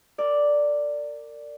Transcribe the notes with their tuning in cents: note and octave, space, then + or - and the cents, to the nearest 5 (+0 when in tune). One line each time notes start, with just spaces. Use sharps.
A#4 -30 D5 +0